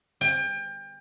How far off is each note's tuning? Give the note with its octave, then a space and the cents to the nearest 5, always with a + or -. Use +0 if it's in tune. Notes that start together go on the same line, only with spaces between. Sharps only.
G5 +30